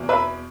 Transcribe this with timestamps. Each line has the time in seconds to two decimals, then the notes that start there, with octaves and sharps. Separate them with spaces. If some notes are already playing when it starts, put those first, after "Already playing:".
Already playing: E2 B2
0.09 B4 E5